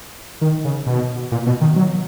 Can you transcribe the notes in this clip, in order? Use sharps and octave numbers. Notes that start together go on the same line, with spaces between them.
D#3
C#3
B2
A#2
B2
D#3
F#3